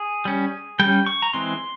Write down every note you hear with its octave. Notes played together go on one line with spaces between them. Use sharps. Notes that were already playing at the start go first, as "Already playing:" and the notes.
Already playing: G#4
G3 C#4
G3 C#4 G5
C#6
A#5
E3 G#3 C4 C6